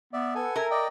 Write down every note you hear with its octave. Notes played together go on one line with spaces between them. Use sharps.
B3 D5 E5
A4 B4 F#5 G#5 E6
A#4 E5 A#5 G#6
D5 D#5 G5 D6